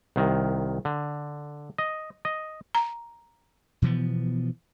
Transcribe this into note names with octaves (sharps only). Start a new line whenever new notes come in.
C2 D#3
D3
D#5
D#5
A#5
B2 E3 F3 B3